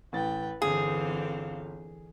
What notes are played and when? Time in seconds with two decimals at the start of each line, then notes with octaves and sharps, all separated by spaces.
0.13 A1 A2 B4 G5 A6
0.62 G1 D3 E3 C4 G#4 F5